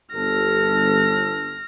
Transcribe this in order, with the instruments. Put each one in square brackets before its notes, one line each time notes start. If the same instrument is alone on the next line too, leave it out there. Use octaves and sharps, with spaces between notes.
[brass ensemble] G1 A4 [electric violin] F6 A#6